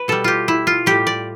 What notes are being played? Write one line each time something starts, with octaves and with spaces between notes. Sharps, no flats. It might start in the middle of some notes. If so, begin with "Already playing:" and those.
Already playing: B4
B2 G3 A4
F4 G4
E4
F4
A2 G3 G4
D5